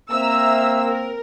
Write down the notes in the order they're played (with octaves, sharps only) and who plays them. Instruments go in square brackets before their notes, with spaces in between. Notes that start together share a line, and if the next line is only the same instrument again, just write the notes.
[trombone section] A#3 C4 [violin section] E5 A#5 E6
[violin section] A#4